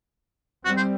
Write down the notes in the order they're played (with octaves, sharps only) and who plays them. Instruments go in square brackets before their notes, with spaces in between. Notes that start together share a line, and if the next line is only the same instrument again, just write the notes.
[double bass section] G3 C4 [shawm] F#4
[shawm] C5